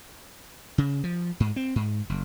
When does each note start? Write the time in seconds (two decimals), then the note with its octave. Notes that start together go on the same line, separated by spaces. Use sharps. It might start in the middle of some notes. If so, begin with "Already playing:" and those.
0.78 C#3
1.04 F3
1.40 G#2
1.56 C4
1.76 G#2
2.09 F#1